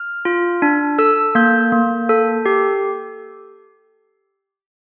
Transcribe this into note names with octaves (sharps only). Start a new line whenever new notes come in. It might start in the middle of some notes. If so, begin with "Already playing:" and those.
Already playing: F6
F4
D4
A4 E6
A#3 G6
A#3
A4
G4